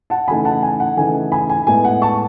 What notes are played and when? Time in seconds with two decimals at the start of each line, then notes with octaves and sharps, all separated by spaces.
0.10 F#5 A5
0.28 C#3 E3 A3 D#4 G#5 B5
0.45 F#5 A5
0.63 G#5
0.80 F#5
0.97 C#3 E3 A3 D#4 G#5
1.32 G#5 B5
1.50 G#5
1.67 A2 G#3 B3 E4 G#5
1.85 F#5
2.02 A5 C#6